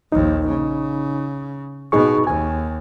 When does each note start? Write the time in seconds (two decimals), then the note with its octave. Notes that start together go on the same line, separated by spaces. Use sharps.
0.12 A#1 D#2 D#4
0.48 C#3
1.92 B2 D#4 G#4 C#6
2.27 D#2 G#5